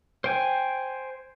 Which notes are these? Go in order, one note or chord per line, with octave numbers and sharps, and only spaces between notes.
C5 G5 G#5